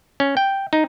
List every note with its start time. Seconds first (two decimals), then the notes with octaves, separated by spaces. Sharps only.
0.20 C#4
0.37 G5
0.73 D#4